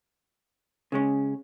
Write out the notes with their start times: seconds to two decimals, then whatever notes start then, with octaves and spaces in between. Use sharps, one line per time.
0.92 C#3 G#3 C#4